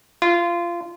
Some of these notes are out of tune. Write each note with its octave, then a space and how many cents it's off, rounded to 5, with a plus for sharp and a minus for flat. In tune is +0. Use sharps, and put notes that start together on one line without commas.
F4 -20